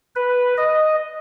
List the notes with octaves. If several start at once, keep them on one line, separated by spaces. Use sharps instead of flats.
B4
D#5